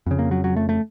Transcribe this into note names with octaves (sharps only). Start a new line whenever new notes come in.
F2 C#3
A#3
F#3
F#3
A3
A3